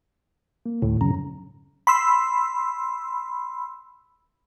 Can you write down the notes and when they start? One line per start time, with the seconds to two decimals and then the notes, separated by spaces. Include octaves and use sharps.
0.66 A#3
0.82 D2 A2
1.01 F#2 C#3 A#5
1.87 B5 C6 E6